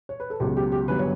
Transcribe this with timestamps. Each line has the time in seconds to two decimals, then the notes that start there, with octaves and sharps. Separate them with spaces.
0.09 C#5
0.20 B4
0.30 A4
0.40 C#2 B2 F#3 G4
0.57 G4
0.72 G4
0.88 G1 G2 F#3 B4
0.99 C#5